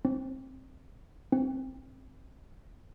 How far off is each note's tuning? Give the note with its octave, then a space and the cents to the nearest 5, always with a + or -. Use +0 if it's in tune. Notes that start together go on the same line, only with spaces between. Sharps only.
C4 +15
C4 +10